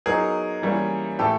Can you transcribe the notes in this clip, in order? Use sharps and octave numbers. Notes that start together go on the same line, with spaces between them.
F#3 B3 D#4 G#4 A#4
E3 G3 A#3 C#4 E4
A2 E3 A3 G4 A4